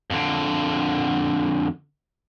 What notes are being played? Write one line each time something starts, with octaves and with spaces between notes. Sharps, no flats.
F2 D3